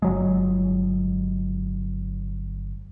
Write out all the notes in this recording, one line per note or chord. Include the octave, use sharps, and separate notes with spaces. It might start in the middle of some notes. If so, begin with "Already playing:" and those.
G1 F#3 G#3